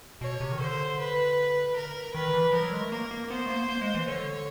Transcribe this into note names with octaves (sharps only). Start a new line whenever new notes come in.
B2 C#5
C3
D#3
D3 C5
B4
A#4
D#3 B4
E3
F3 A#4
F#3
G#3
A3
A#3 A#4
A#3
B3 C5
A3
A#3
A#3
G#3
E3
D3 C#5